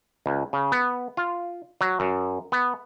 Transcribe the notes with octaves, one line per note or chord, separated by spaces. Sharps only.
C#2
C#3
B3
F4
F#3
F#2
B3